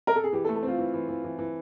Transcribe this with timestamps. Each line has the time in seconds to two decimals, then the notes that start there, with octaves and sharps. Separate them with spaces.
0.07 A#4
0.16 A4
0.24 G#4
0.32 E3 G4
0.45 A4
0.49 A3
0.56 A4
0.63 C4 F4
0.78 E3
0.94 E3
1.09 E3
1.24 E3
1.39 E3